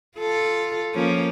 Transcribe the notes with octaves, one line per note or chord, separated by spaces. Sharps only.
F4 A4
F3 A#3 C#4